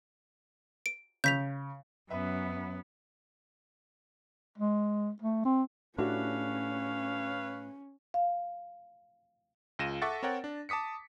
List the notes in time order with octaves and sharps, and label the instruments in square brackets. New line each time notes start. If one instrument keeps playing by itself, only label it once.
[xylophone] D7
[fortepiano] C#3 [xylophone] G6 B6 F7
[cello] F#2 [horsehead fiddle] B3 [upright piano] B4 E5
[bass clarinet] G#3
A3
C4
[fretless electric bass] A2 [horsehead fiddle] C#4 [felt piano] D4 F#4 G4 [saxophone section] B4 C#5 F5
[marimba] F5
[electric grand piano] C#2 F4 A#6 D#7 E7
A4 E5 F#5 C#6 D6 A6
C4 A#4 C#5 F#5 G5
D4
A5 D6 D#6 B6 C#7